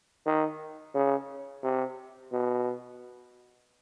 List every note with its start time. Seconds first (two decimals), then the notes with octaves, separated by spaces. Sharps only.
0.26 D#3
0.95 C#3
1.63 C3
2.32 B2